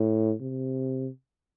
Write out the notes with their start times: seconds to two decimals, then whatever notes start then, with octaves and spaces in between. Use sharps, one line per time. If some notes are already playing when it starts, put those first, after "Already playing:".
Already playing: A2
0.41 C3